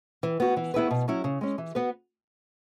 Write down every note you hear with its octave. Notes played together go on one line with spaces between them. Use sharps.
E3
B3 F#4
E3
B3 E4 G#4 B4
B2
F#3 C#4 E4
C#3
G#3 C#4
E3
B3 F#4 B4